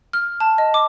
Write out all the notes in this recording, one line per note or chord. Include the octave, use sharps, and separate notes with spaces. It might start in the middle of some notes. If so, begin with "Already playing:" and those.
F6
A5
D#5
D6